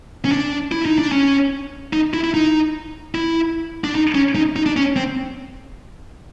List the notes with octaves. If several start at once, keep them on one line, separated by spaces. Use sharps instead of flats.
C#4
D4
E4
D#4
D4
C#4
D#4
E4
E4
D#4
E4
D4
D#4
C#4
D#4
D#4
D4
C#4
C4